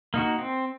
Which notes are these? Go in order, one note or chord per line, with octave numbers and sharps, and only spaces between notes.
A#3 D#4 F#4
C4